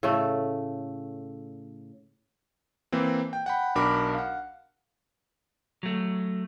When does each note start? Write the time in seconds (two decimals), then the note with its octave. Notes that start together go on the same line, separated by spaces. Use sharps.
0.03 A2 C#3 A3
2.92 E3 A#3 C4
3.33 G5
3.46 F#5 G5 B5
3.75 B1 D4 F#4 A#4 B5 D6
4.14 F5 F#5
5.83 F#3 A3